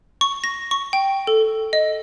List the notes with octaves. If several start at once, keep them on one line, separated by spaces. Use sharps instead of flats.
C#6
A#6
C#6
G5
A4
D#5